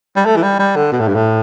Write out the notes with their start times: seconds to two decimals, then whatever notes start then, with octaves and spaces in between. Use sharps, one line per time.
0.16 G3
0.25 A3
0.36 E3
0.43 G3
0.59 G3
0.76 D3
0.92 B2
1.00 A2
1.08 G2
1.15 A2